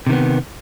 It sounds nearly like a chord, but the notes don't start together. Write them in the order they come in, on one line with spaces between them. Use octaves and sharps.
C3 D#3 B3